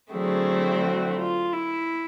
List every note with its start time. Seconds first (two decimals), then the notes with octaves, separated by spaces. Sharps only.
0.11 D3 F#3 A3 C4 E4 G#4
0.82 F#4
1.18 F4
1.53 E4